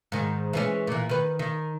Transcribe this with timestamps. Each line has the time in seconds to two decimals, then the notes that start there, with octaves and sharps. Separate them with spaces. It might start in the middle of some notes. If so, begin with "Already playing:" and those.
0.12 G#2 D#3
0.53 E3 G#3 C#4
0.87 A#2 E3
1.09 D#3 B4
1.39 D#3